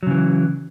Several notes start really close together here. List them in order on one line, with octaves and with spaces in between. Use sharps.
F#3 C#3 E3